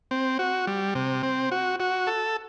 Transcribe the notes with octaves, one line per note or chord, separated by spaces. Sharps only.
C4
F#4
G3
C3
C4
F#4
F#4
A4